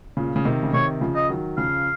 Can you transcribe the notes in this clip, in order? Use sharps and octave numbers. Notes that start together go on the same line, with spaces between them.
A#2 C#3
C#3
C3 D#3
C#3
C3 D#3 C#5
C#3 F3
D#5
D#3 F#3
C#3 F3 F5